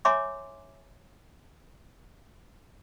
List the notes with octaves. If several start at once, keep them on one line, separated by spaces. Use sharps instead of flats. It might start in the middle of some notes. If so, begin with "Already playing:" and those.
C#5 E5 G#5 A#5 C6 D6